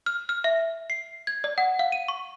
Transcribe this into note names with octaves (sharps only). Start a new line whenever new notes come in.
F6
F6
E5
C7
G#6
D5
F#5
F5
D#7
C#6